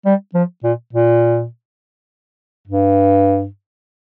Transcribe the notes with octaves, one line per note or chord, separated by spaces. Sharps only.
G3
F3
A#2
A#2
G2